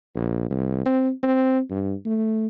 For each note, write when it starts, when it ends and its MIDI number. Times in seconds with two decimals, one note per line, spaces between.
0.15 0.45 34
0.50 0.86 36
0.86 1.11 60
1.23 1.60 60
1.70 1.94 43
2.06 2.47 57